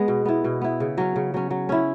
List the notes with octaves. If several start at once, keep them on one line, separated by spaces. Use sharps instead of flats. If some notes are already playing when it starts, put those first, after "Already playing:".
Already playing: G#3 B3
B2
B3 E4
B2
B3 E4
C#3
F#3 C#4
C#3
F#3 C#4
F#3
C#4 E4